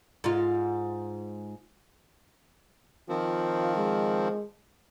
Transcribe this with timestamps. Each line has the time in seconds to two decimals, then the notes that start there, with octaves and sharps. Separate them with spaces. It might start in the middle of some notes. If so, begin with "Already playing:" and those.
0.24 G#2 F4
3.09 D#3 F3 C4 F4
3.76 G#3